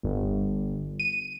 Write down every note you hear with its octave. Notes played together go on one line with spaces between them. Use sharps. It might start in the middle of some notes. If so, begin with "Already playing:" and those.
G1
D#7